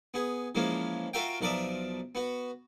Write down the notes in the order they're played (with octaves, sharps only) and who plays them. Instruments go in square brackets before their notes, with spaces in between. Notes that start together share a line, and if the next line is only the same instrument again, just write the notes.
[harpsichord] B3 G#4
E3 F3 G#3 A#3 C#4
F4 F#4 A#4 E5 F5 G5
B1 F3 A#4 D5 E5 D#6
B3 F#4